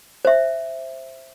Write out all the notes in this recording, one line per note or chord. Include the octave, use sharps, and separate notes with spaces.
C5 E5